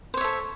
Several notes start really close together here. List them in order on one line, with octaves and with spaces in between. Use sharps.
C5 C#5 E5 A4